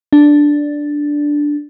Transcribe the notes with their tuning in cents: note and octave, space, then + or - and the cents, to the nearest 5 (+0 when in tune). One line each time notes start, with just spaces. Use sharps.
D4 +0